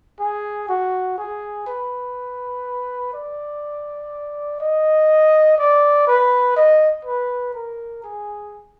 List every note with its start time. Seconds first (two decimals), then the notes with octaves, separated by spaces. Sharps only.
0.20 G#4
0.69 F#4
1.18 G#4
1.67 B4
3.14 D5
4.60 D#5
5.58 D5
6.07 B4
6.56 D#5
7.05 B4
7.54 A#4
8.04 G#4